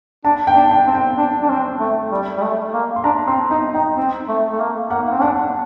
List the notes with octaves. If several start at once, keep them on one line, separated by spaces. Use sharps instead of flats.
D4 A5
G5
D4
G5
C4
G5
D4
D4
C4
A3
G3
G3
A3
A#3
C6
D4 A#5
C4 C6
D#4 A#5
D#4 G5
C4
A3
A3
A#3
A#3 F#5
A#3
C4
D4 F#5